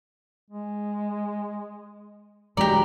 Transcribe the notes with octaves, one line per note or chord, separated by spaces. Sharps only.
G#3
D2 E3 F#3 G#3 G4 D5 A#5